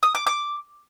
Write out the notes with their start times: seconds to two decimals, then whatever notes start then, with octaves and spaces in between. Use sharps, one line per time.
0.03 D#6
0.15 D6
0.27 D6